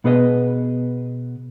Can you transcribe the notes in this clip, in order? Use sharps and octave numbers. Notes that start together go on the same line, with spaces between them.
B2 B3 G#4 B4 D#5